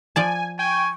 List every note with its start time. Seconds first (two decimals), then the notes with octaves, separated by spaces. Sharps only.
0.16 F3 D5 G#5 A5
0.59 G5 G#5 C#6